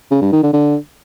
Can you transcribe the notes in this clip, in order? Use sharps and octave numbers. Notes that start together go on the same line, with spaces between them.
C#3
G2
D#3
D3
D3